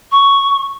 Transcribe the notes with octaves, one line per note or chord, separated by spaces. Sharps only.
C#6